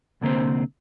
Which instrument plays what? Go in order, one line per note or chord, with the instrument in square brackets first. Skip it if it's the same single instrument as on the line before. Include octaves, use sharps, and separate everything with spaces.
[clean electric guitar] C2 D3 A#3 C4 C5